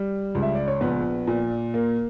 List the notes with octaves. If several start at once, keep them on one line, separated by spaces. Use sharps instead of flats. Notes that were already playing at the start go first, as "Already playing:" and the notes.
Already playing: G3
C#2
E5
D5
C#5
A#1 B3 B4
A#2
A#3